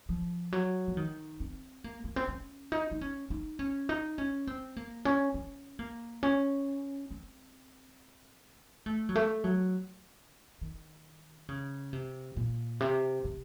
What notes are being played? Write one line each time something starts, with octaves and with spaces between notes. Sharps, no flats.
F3
F#3
F3
D#3
C4
A#3
A#3
C4
C#4
D#4
D#4
C#4
D#4
C#4
D#4
C#4
C4
A#3
C#4
C#4
A#3
C#4
C4
A3
F#3
A3
F#3
D#3
C#3
C3
A#2
C3
C3